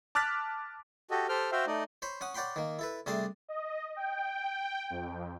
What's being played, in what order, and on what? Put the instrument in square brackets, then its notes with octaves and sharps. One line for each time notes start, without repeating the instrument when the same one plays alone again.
[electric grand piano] A5 D6 F6 F#6 A6 B6
[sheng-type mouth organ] F#4 G4 A4 D#5
G4 A4 C5 G5 F6
F#4 C5 E5 F5 G5
A3 D#4 D5 D#5
[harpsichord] C5 C#5 B5
C#4 F#5 D#6
C#5 D5 F#5 G5 B5 C6
D#3 A#3
E4 A4 B4
C3 G3 A3 D4 G#4 A5
[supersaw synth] D#5
G5
F2